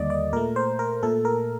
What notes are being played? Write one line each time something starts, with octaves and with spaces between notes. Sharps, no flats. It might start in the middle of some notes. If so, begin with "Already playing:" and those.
Already playing: D#2 D3 G3 A#3 D5 D#5
D5
A#2 A3 A#4
C5
A#4
A#2 A3 A4
A#4